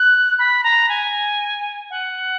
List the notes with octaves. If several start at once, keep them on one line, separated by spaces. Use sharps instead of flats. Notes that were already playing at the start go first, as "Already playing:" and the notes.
Already playing: F#6
B5
A#5
G#5
F#5